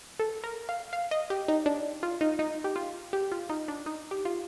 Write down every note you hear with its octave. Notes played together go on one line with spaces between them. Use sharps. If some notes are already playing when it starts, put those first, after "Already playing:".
A4
A#4
F5
F5
D#5
G4
D#4
D4
F4
D#4
D#4
G4
F4
G4
F4
D#4
D4
D#4
G4
F4